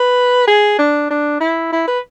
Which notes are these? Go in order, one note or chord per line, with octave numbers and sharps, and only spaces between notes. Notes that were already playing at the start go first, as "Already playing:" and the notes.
Already playing: B4
G#4
D4
D4
E4
E4
B4